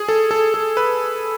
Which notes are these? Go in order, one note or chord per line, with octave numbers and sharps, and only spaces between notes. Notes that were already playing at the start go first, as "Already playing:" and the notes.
Already playing: G#4
A4
A4
A4
B4